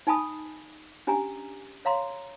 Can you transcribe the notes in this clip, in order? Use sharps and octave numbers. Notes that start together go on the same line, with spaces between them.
D#4 G#5 A5 B5 D#6
C#4 D4 G4 G#5 A#5
C#5 F5 A#5 C6